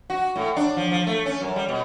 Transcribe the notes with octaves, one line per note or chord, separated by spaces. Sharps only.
F#4
A2
D4
F3
F3
A3
C#4
F#2
G3
B2